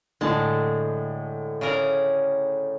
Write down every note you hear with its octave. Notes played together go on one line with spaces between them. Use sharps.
A2 D3 G#3 A5
C#3 A#4 D5